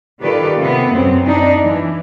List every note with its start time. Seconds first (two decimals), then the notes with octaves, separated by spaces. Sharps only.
0.20 D#3 F4 G4 A4 B4 D5
0.58 C3 B3
0.94 F#2 C4
1.26 D4 D#4
1.60 E3